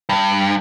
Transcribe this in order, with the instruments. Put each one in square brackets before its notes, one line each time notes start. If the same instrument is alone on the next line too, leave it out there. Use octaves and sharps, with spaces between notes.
[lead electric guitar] G2